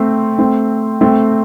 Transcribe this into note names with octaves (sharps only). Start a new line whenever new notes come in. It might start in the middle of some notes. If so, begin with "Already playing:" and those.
Already playing: A3 C4
A3 C4
A3 C4